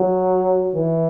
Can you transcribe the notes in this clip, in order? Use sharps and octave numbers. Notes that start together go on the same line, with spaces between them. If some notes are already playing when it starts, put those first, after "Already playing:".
Already playing: F#3
E3